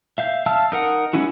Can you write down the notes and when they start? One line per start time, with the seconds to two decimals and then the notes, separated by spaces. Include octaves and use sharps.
0.18 E5 F5 G6
0.46 E5 F5 A5 E6 F6
0.72 D#4 A#4 F#5
1.13 G#3 C#4 D#4 E4 F#4